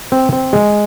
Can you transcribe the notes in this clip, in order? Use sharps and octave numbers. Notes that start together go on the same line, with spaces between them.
C4
C4
G#3